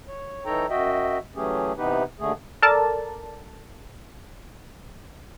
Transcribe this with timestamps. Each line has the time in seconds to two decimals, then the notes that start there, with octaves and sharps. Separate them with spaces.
0.08 C#5
0.45 E3 D#4 A4 C#5 G5 A#5
0.70 F#2 F#4 D#5 E5 G5
1.36 E3 F#3 A3 C#4 G4 G#4
1.77 C3 E3 B3 D#4 G4 B4
2.20 D#2 D3 A3 G#4
2.62 A4 A#4 D5 A5